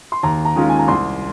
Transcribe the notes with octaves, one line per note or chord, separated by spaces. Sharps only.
C6
D#2 A#5
A#5
D#3 G#3 C#4 F4
G#5
A#5
C2 C6